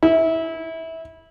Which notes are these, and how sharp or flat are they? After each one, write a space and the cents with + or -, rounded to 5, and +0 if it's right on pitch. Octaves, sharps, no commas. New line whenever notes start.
E4 -20